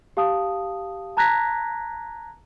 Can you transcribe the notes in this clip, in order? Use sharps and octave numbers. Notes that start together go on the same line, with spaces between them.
G4 F5 A5 D#6
A5 A#5 F#6 G#6 A#6 B6